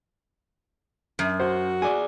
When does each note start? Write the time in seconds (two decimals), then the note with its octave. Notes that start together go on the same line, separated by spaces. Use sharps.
1.19 F#2
1.40 F#4 C5
1.82 G#4 D5 G#5